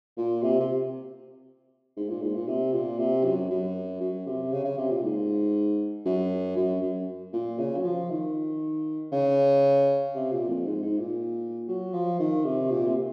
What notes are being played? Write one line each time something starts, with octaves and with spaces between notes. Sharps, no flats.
A#2
C3
C3
G#2
A#2
G#2
A#2
C3
A#2
C3
F#2
F#2
F#2
C3
C#3
C#3
C3
A#2
G#2
F#2
F#2
F#2
A#2
C#3
F#3
F3
D#3
C#3
C3
A#2
F2
G#2
G#2
A#2
F#3
F3
D#3
C3
A#2
C3